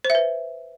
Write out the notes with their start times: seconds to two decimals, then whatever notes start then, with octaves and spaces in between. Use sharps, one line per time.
0.05 C5
0.10 E5
0.15 B4